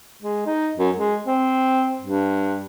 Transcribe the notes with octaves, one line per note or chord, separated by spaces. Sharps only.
G#3
D#4
F#2
G#3
C4
G2